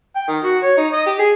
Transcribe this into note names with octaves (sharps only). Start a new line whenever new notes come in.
G5
D#3
F#4
C#5
D#4
D#5
G4
G#4